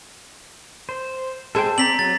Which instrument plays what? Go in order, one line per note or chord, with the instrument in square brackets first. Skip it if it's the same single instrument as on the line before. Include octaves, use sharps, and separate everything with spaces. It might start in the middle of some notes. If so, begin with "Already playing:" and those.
[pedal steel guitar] C5
[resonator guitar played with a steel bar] G#3 G#4 [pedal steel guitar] A4 C5 G5
[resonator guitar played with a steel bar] C4 [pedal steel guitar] D5 [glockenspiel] A#5 B6 F#7
[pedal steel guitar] F#3 [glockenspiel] A6